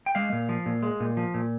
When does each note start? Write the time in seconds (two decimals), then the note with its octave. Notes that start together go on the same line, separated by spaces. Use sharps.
0.06 G5
0.15 G#3 F5
0.33 A#2
0.49 F3
0.66 A#2
0.83 G#3
1.00 A#2
1.17 F3
1.34 A#2